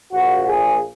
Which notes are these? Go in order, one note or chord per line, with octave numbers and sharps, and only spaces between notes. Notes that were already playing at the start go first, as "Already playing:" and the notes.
A#1 A#2 A#3 F#4
G#4